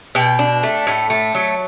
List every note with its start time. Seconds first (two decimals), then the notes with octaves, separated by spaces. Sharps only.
0.15 B2 G5
0.39 D4
0.63 A3
0.87 A2
1.10 A3
1.35 F#3